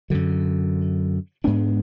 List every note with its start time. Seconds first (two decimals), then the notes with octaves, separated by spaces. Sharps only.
0.10 F#2 D3 F#3
1.44 G#2 G#3 B3 D4